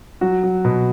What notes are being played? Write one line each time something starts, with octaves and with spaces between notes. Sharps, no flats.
F#3 F#4
F#3
B2